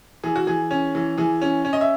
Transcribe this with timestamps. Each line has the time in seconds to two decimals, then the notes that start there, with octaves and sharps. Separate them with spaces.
0.24 E3 G#4
0.36 F#4
0.47 E3 G#4
0.71 C#4
0.95 E3
1.18 E3 G#4
1.42 C#4
1.65 C#4
1.73 D#5
1.81 E5